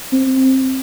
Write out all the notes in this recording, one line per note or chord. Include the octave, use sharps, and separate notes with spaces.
C4